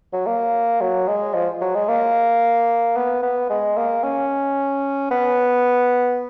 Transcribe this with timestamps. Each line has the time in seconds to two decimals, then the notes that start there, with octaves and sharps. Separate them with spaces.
0.13 F#3
0.27 A#3
0.81 F#3
1.08 G#3
1.34 F3
1.61 F#3
1.75 G#3
1.88 A#3
2.96 B3
3.23 B3
3.50 G#3
3.77 A#3
4.04 C#4
5.11 B3